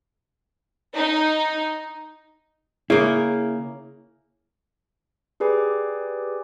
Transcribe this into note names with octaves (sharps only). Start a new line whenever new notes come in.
D#4
C#3 A#3 E4
G4 G#4 B4 D5 G#5 D6